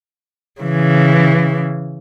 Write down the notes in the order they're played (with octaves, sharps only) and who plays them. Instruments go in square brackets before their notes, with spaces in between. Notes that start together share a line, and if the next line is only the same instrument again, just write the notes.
[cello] C#3 E3